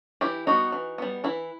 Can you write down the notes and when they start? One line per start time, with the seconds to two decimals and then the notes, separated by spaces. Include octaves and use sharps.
0.21 E3 E4 G4
0.47 G3 B3 D#4 F#4
0.72 E3
0.98 G3 B3
1.24 E3 E4